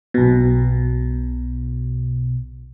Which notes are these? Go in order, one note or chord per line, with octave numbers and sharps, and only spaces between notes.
B1 B2